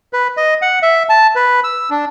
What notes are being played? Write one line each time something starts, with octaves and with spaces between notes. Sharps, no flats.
B4
D#5
F#5
E5
A5
B4
E6
D4